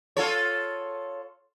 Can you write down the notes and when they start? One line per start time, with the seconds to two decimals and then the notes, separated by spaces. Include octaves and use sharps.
0.17 F4 A4 C#5